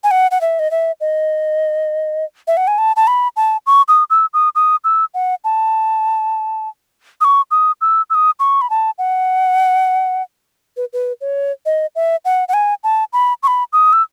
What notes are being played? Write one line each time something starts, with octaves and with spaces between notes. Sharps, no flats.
G#5
F#5
F#5
E5
D#5
E5
D#5
E5
F#5
G#5
A5
A5
B5
A5
C#6
D#6
E6
D#6
D#6
E6
F#5
A5
D#6
C#6
D#6
E6
E6
D#6
C#6
B5
A5
F#5
B4
B4
C#5
D#5
E5
F#5
F#5
G#5
A5
B5
C#6
B5
D#6
E6